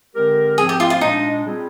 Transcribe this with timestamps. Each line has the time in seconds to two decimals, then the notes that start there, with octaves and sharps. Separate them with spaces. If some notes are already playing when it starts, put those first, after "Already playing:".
0.15 D3 G#3 C4 G4 A#4
0.58 G#2 F3 C4 G#4
0.69 G4
0.80 F4
0.90 F4
1.01 A#2 G#3 D4 D#4
1.44 G3 C4 F4 G#4